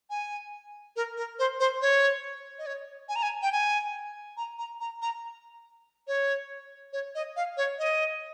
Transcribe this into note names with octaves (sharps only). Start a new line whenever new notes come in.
G#5
A#4
A#4
C5
C5
C#5
D#5
C#5
G#5
A#5
G#5
G5
G#5
A#5
A#5
A#5
A#5
C#5
C#5
D#5
F5
C#5
D#5